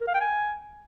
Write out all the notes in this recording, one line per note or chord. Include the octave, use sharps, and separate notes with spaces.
A#4
F5
G5
G#5